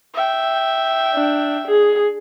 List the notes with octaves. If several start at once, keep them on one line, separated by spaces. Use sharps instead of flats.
E5 G5
D4
G#4